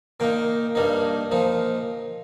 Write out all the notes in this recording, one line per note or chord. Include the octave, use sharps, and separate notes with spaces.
A#2 A#3 D#4 G5
G2 G3 A#3 D#4
A#2 F3 D#4